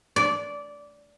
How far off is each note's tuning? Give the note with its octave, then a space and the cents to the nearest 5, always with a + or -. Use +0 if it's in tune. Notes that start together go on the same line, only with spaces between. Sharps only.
D5 -15